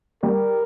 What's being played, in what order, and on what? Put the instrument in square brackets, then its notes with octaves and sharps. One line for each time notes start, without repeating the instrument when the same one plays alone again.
[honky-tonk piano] G3 [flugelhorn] A#4